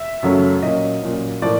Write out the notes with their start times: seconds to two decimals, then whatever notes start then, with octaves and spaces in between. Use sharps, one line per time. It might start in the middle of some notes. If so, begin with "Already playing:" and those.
Already playing: E5
0.23 F#2 C#3 F#3 A3 C#4
0.63 A#2 F#3 A#3 C#4 D#5
1.02 A#2 F#3 A#3 C#4
1.42 A2 F3 A#3 D5